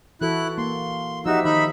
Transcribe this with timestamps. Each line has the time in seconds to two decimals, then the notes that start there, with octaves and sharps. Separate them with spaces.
0.21 E3 E4 F#4 A4 F#6
0.58 A#3 C6
1.26 F3 D#4 F#4 G4 E5 E6
1.45 D#3 D#4 E5 B5